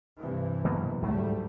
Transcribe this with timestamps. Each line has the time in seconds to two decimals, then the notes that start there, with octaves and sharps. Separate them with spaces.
0.20 G2 C3 E3
0.65 B2 F#3 A#3
1.02 D2 G#2 F#3 G3 A3